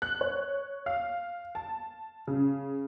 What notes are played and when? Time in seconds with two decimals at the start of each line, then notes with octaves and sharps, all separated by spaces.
0.02 F#6
0.21 C#5
0.86 F5
1.55 A5
2.27 C#3